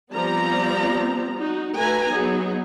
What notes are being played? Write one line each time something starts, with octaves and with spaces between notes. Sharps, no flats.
F3 G3 B3 C4 D5 A#5
D#4 F#4
A3 F#4 B4 G#5 A#5
F#3 B3 D#4 G#4